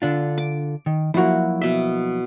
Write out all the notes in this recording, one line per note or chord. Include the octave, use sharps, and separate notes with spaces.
D3 D4 F4
D6
D#3
F3 F#3 A#3 E4 F#4
B2 E5